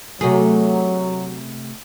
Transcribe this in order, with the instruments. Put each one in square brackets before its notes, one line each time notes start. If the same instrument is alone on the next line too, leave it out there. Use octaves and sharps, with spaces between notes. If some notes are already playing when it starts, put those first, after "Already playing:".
[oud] C3 A3 G#4 [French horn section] F#3